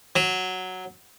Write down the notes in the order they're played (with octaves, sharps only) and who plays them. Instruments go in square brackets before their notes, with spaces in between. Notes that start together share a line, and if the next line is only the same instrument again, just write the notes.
[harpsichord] F#3